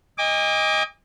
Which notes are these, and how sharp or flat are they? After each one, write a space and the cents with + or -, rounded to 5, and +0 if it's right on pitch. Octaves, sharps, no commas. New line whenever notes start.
D#5 +10 G#5 -45 D6 +0